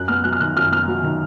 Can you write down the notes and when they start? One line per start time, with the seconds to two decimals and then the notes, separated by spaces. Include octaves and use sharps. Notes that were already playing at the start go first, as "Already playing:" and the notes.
Already playing: F#2 F#6
0.08 B3 F6
0.24 F#3 F#6
0.33 F6
0.40 D#3 F#6
0.57 F#2 F6
0.72 B3 F6
0.88 F#3
1.03 D#3